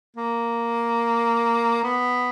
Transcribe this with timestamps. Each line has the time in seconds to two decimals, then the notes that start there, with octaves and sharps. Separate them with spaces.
0.17 A#3
1.84 B3